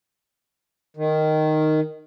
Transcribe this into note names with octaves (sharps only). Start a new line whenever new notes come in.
D#3